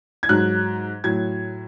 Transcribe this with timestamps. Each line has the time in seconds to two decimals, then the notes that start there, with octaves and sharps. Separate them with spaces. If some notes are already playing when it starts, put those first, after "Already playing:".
0.23 G#6
0.29 G#2 F#3 F#6
1.04 A2 F#3 G#6